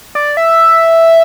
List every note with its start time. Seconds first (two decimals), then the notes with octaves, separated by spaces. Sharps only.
0.15 D5
0.37 E5